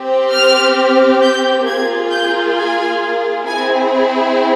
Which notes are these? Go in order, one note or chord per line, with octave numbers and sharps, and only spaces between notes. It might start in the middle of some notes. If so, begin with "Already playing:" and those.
Already playing: C4 G4
F6
G6
A#3 F4 G#4 G#6
G6
G#5
C4 E4 G#4 G#5